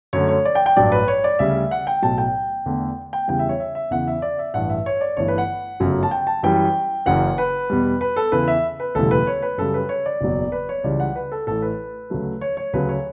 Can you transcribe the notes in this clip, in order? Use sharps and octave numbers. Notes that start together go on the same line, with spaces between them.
F#2 D3 A3 C#5
C#5
D5
G5
G5
A1 G2 F#3 D5
B4
C#5
D5
D2 C#3 G3 E5
F#5
G5
B1 A2 F#3 A5
G5
E2 D3 A3
G5
E2 C#3 E3 G3 G5
E5
C#5
E5
E5
E2 C#3 E3 F#5
E5
D5
E5
A1 G2 E3 F#5
E5
C#5
D5
G1 G2 E3 A3 C#5
B4
F#5
G1 F#2 C#3 F#3 A3
A5
G5
A5
F#2 E3 G3 G5
F#1 F#2 C#3 E3 F#5
B4
E2 B2 G3
B4
A4
E2 C#3 E3 B4
E5
B4
E1 D2 C#3 E3 G3 A4
B4
C#5
B4
F#2 C#3 G3 A4
B4
C#5
D5
F#1 E2 B2 F#3
B4
C#5
C#2 C#3 E3 G3 D5
F#5
B4
A4
A1 A2 E3 A4
B4
D2 C#3 F#3 A3
C#5
C#5
D2 C#3 F#3 A3 B4
C#5